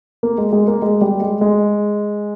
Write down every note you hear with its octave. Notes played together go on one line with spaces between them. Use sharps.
A#3
G#3
G#3
A#3
G#3
G3
G#3
G#3